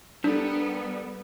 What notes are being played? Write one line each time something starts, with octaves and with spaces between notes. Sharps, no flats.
G3 B3 D4 A4 A#4